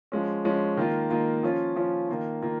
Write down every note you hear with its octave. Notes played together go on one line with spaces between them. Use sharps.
F3 G#3 C#4
F3 G#3 C#4
D#3 A#3 F4
D#3 A#3 F4
F3 C#4 F4
F3 C#4 F4
D#3 A#3 F4
D#3 A#3 F4